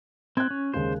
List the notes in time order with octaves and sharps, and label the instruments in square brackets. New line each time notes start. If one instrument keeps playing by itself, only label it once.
[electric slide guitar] C4 [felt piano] F#6 G#6
[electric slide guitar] C#4
[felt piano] D#2 C#3 G#3 [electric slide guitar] C5